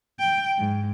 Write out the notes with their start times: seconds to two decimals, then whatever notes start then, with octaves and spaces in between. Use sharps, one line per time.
0.19 G5
0.58 G#2